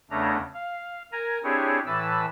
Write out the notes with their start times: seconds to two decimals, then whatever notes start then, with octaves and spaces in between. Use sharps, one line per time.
0.11 E2 C#3 A3 C#4 D4 A#5
0.54 F5
1.12 A#4 G#5 A#5
1.44 C4 D4 E4 G4 G#4 C#5
1.86 A2 E3 B4 A5 E6